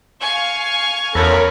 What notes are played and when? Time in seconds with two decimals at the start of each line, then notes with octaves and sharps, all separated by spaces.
0.20 F5 G#5 C#6
1.15 E2 C#4 A4 A#4 B5